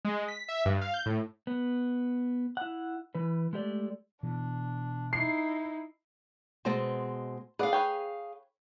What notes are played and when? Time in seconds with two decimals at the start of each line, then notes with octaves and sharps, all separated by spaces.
0.05 G#3
0.28 B6
0.48 E5
0.65 G2
0.81 F5
0.94 G6
1.06 A2
1.47 B3
2.57 E4 F#5
3.15 E3 B4
3.53 G#3 A3 G4 C#5 D5
4.23 B2 E3 D4
5.13 D#4 E4 C7
6.65 B2 G#3 C4 C5 A5
7.59 G#4 B4 D5 F5 F#5
7.73 B4 C#5 G5